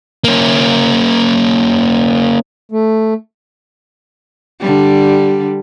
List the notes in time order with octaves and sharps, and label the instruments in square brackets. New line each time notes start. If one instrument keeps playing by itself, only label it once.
[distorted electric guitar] A#3 C#4
[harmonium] A3
[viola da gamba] D3 G3